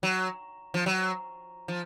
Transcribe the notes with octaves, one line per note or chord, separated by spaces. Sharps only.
F#3
F3
F#3
F3